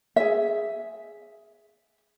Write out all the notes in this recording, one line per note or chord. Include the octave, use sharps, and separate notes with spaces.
G#4 E5